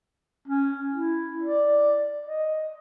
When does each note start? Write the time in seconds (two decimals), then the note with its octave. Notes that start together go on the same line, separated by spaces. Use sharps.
0.48 C#4
0.91 E4
1.42 D5
2.25 D#5